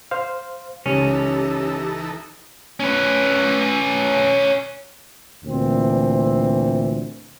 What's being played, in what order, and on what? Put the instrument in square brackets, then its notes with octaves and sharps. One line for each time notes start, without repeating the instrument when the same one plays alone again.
[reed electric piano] C5 F5
[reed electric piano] C#2 [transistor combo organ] E3 D#4 A4 [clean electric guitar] C#4 [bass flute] G4
[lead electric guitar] C#4 B4
[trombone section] D2 A#2 E3 C4